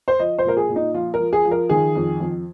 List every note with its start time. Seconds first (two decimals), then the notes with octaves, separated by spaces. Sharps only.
0.08 C5
0.19 F3 D#5
0.39 C5
0.45 A#2 A#4
0.57 G#4
0.69 A#2
0.76 D#4
0.94 F3 F4
1.14 A#4
1.20 F3
1.33 G#4
1.45 F3
1.51 A#4
1.69 D#3 G#4
1.95 F2
2.20 F2